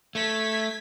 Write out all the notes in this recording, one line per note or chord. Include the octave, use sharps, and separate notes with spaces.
A3 G#6 B6